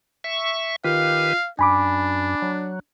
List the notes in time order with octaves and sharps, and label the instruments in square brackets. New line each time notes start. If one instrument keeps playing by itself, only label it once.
[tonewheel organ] E5 C#6
[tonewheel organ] D#3 G4 B4 [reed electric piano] F4 [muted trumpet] F5
[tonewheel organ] F#2 [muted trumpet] D4 [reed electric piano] G#5 B5 D6
[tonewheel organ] F#3